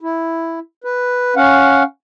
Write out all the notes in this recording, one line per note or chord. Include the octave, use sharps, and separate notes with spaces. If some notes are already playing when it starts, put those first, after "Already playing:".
E4
B4
C#4 F5 F#5